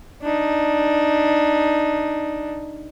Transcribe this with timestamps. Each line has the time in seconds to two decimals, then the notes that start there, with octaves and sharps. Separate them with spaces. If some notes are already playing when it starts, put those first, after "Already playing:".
0.22 D4 D#4